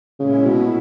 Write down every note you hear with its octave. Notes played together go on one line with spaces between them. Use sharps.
A#2 C#3 G#3 C#4 E4
B2